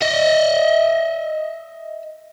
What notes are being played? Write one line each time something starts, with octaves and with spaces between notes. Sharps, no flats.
D#5 E5